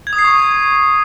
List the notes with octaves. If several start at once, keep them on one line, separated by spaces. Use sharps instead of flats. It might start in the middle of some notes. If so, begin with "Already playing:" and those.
G#6
D#6
C7
C#6